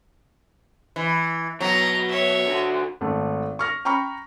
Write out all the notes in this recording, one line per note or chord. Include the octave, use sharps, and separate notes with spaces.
E3
B2 F#3 A#5
C#5 E5
D3 F#4
G#1 A3
C#6 F6 A#6
G5 A#5 B5 C#6 F6